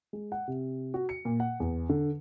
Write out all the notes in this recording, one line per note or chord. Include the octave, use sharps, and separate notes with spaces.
G#3
F#5
C3
F#4
C#7
A#2
F#5
E2
D3